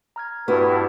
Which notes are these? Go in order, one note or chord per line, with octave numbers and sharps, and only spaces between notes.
A#5 F6 G#6
G2 B3 D4 E4 F#4 G4 B4